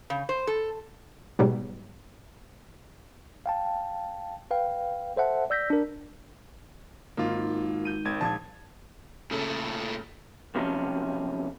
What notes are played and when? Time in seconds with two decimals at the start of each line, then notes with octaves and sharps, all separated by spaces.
0.10 C#3
0.29 C5
0.47 A4
1.39 G#2 B2 F#3 G3
3.46 F5 G5 A5
4.51 B4 F5 G5
5.16 A4 C5 E5 F#5 A5
5.50 D5 E6 G6 A#6 B6
5.70 D4 A#4
7.17 G#1 A#3 F4
7.85 G6 D#7
8.05 G#1 G#6
8.21 A#1 A5 G#6
9.31 A#2 C#3 A3 A4
10.55 B1 C3 D#3 F3 C#4